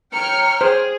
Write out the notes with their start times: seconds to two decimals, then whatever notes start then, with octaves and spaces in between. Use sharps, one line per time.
0.13 C#5 G5 A#5 F6 C#7
0.61 G#4 C5